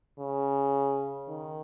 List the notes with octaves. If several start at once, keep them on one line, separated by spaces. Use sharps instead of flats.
C#3
D#3